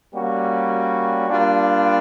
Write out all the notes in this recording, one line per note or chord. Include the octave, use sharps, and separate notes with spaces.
G3 A#3 C#4 F#4
G3 A#3 D4 F4